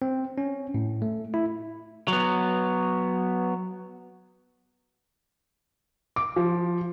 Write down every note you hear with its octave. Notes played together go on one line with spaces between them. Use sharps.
C4
C#4
A2
A3
E4
F#3 B3
D6
F3